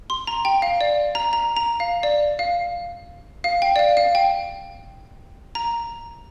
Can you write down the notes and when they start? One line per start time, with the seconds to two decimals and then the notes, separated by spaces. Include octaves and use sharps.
0.10 C6
0.27 A#5
0.45 G5
0.62 F5
0.81 D5
1.15 A#5
1.33 A#5
1.57 A#5
1.80 F5
2.03 D5
2.39 F5
3.44 F5
3.62 G5
3.76 D5
3.79 F5
3.97 F5
4.15 G5
5.55 A#5